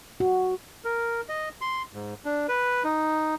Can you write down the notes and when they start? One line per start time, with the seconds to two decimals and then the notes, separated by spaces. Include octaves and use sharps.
0.20 F#4
0.85 A#4
1.29 D#5
1.61 C6
1.94 G#2
2.25 D4
2.48 B4
2.84 D#4